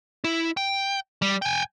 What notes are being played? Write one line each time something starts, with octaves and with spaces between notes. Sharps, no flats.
E4
G5
G3
G5 G#5